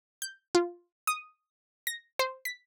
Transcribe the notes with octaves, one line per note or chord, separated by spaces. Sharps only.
G6
F4
D#6
A#6
C5
B6